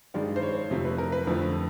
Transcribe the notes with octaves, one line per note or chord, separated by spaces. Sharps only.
G2 D#3 G#3 D5
C5
C#5
F2 C3 F3 A3
B4
A#4
B4
F2 D3 F3 A3